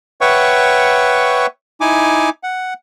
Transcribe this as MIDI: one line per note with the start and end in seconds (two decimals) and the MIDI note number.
0.21 1.47 71
0.21 1.47 73
0.21 1.47 76
0.21 1.47 78
0.21 1.47 79
0.21 1.47 85
1.81 2.30 63
1.81 2.30 64
1.81 2.30 80
1.81 2.30 86
2.43 2.74 78